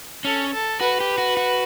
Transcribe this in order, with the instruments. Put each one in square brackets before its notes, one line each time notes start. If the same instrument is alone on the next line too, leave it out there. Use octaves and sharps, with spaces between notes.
[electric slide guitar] C#4 [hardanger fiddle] A4
[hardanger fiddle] A4
[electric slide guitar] F#4 [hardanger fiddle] B4
[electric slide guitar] G4
F#4
F#4